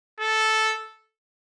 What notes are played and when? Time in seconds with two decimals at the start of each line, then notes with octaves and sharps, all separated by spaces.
0.20 A4